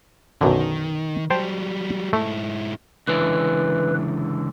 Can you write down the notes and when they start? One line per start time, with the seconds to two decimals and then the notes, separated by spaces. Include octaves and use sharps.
0.41 B1 F#2 D3 D#3
1.30 F#3 G3 C5 G5 A5
2.13 G#2 A3 E4
3.08 C#2 D3 E3 B4